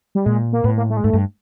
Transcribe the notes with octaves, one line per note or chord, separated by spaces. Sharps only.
G3
A#2 G#3
A#3
A2 B3
A#3
A3
G#3
G#2 A3
G2